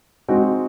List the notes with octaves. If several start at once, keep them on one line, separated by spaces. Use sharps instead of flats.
G#3 C4 D#4 F#4